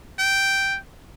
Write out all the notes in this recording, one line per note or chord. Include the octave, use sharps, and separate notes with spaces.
G5